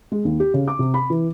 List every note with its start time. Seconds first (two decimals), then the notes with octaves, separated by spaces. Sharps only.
0.12 G#3
0.25 D#2
0.40 G4
0.54 C#3
0.68 D6
0.79 C3
0.94 B5
1.10 E3